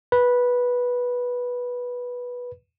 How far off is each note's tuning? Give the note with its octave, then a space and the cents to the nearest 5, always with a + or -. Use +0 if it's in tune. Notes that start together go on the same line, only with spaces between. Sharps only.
B4 -10